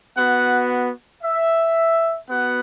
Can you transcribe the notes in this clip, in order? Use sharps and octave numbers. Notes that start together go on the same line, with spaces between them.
B3 F#4 F#5
E5
B3 F#4 F#5